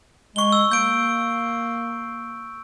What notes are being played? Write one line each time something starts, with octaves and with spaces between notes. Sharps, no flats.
G#3 C#6 G7
E6
A#3 G6 D7